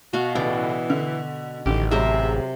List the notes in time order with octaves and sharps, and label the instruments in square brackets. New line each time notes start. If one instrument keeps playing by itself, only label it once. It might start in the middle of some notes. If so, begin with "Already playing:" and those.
[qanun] B2 F5 [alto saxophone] F#4
[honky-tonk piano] C#2 A2 [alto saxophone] E3 [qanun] B3 D5
[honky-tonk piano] D3
[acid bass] A1 [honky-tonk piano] D3 D#3 [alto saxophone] G4
[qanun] C3 A#4 C5 [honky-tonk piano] F#3 G#3 [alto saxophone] E5